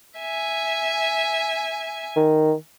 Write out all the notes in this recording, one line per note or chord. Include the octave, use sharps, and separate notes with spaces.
E5 G#5
D#3